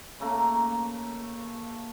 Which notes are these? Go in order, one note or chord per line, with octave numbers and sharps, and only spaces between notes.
C#3 A3 A#3 A#5